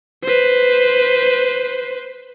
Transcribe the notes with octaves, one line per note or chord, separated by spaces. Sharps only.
B4 C5